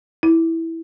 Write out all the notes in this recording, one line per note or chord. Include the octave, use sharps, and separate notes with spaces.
E4